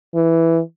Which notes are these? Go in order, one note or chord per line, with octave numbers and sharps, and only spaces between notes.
E3